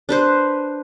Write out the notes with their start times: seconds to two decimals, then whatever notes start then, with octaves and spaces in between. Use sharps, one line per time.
0.09 D4 B4 C5